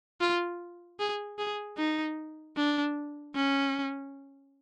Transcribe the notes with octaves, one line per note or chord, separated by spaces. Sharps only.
F4
G#4
G#4
D#4
D4
C#4